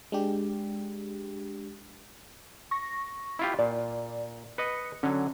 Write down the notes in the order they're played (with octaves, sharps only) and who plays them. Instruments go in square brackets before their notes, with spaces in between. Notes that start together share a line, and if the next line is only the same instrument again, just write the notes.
[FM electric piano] G#3 D4 G4
[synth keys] C#6 A#6
[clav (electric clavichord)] E4 F4 G4
[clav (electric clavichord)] A#2 [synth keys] D5
[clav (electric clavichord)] B4 D#5 [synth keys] C#7
[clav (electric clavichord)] D3 F#3 [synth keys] C#4